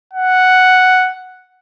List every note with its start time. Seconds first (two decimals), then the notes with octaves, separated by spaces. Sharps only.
0.13 F#5